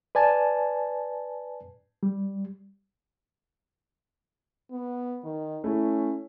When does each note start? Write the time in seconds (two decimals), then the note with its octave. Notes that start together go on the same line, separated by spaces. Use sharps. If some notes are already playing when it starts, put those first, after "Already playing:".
0.15 B4 D5 G#5 A5
2.03 G3
4.71 B3
5.24 D#3
5.64 A3 C#4 E4